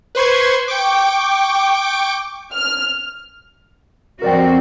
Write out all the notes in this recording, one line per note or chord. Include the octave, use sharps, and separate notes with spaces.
B4 C5 C6 C#6 G#6
G5 C#6 D6
F6
F2 C4 F#4 A#4 D5 G5